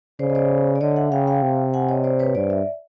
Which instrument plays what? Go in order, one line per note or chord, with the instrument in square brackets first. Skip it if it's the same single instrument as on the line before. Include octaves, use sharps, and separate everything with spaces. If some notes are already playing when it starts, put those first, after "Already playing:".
[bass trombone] C#3 [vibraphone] C5 D5
[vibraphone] D#5
C5 D5
D5
[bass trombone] D3 [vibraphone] C#5 D#5
[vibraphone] E5 F#5
[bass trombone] C#3 [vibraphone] F5 G5
[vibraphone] F5 G5
[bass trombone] C3
[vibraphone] F#5 G#5
C#5 D#5
C5 D5
B4 C#5
[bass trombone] G2 [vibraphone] C5 D5
[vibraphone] D5 E5